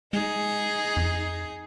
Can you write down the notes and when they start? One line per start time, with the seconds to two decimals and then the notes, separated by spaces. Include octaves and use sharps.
0.13 G#3 D#4 G#4
0.97 F2